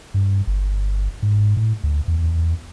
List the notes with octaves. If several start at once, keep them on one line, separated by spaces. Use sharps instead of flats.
G2
G1
G#2
A2
D2
E2